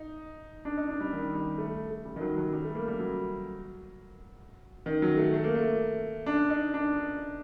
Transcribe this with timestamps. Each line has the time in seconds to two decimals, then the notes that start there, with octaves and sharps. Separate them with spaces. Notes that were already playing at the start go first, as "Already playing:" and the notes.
Already playing: D#4
0.65 D4
0.77 D#4
0.89 D4
1.00 G3
1.12 D#3
1.35 G3
1.58 A3
1.90 A3
2.05 G3
2.16 D#3
2.21 F#3
2.37 F#3
2.53 G3
2.65 A3
2.75 A#3
2.88 G3
2.98 F#3
4.86 D#3
5.02 F#3
5.17 A3
5.33 A3
5.44 A#3
5.55 A3
6.26 D4
6.50 D#4
6.74 D4